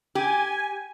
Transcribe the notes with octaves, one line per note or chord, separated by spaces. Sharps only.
G4 G#5